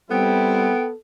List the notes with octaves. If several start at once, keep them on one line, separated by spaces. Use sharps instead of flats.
G3 B3 C4 E4 A4 G5